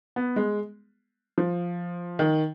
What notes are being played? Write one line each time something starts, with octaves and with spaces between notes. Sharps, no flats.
B3
G#3
F3
D#3